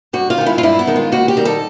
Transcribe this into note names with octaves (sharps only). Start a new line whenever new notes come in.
G2 F#4
F4
D#3 G#3
E4
F4
G2 E4
B3
D#3 G#3
F4
D#2 F#4
G4
D#3 G3
A4